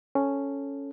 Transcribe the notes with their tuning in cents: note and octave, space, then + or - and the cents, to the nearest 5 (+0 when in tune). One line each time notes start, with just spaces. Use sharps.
C#4 +0 A4 +0